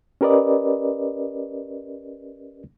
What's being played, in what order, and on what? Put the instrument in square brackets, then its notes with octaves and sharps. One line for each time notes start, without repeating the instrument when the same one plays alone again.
[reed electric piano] C#4 G4 A#4 B4 D5 D#5